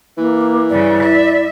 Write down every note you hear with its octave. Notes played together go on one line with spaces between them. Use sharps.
E3 A#3
G2 C#3 D5
E4 E5